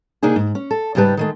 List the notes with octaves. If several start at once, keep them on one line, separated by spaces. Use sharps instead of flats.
C3 A#3 D4 D#4 G#4
G#2
C#4
A4
G#2 C#3 G3 G4 B4 A5
D#3 G#3 A3